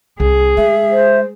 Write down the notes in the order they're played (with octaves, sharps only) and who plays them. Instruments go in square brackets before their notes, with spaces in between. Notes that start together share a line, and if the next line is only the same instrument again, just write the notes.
[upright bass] C2 [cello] G#4
[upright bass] G#3 [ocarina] E5
[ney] C5